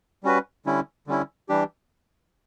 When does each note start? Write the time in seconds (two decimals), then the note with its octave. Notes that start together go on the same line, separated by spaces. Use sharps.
0.24 G3 C#4 F#4 B4
0.66 D3 G3 C#4 E4
1.07 D3 G3 C#4 E4
1.49 E3 G3 D4 G4